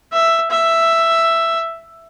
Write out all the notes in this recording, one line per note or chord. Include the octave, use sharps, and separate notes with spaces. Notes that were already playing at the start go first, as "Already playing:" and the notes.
E5
E5